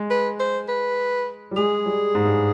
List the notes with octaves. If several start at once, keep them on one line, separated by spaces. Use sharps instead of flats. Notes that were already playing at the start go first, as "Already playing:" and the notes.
Already playing: G#3
B4
C5
B4
G3
G#3 G#4
G3
G#2
G2